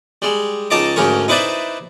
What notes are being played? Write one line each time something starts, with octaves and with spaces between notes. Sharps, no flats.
G3 G#3
C#2 D#4 D#5 A5 A#5 D6
D2 G#2 C#4 A#4 C#5
D#4 E4 B4 C5 D5 E5